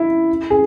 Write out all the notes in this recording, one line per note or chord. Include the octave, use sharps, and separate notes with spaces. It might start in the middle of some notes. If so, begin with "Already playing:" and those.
Already playing: E4
G#4